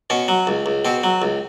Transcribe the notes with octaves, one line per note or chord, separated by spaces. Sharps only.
B2 C#4
F#3
C#2
C#2
B2 C4
F#3
C#2